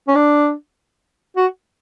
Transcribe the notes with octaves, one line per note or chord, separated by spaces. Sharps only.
C#4
D4
F#4